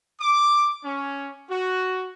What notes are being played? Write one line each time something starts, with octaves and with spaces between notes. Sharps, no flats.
D6
C#4
F#4